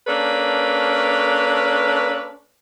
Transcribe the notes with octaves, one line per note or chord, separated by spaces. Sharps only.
A#3 C#4 D4 A4 B4